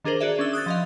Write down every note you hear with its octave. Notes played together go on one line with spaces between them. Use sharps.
D#3 D4 G#4 A#4 C5 F#7
F#4 G#4 D5 E5
C#4 D4 E6 G7
D#6 F#6 G#6 A6
F3 D#5 F5